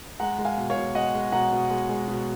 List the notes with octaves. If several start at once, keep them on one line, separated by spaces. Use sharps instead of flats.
G#3 F#5 A#5
G#3
F5 G#5
B2
C#5 F5
B2
G#3 D#5 F#5
G#3
B2 F#5 A#5
B2
G#3
G#3
B2